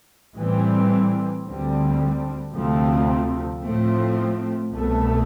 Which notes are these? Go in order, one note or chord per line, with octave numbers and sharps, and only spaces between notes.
A2 E3 G3 C4
D2 D3 G3 C4
D2 C3 F3 A3 C4
A2 F3 A3 C4
C2 B2 A3